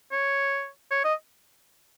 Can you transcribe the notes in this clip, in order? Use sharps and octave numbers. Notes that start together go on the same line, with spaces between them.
C#5
C#5
D#5